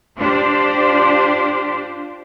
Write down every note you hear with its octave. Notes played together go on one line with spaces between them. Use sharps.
D4 F4 G4 C5 D5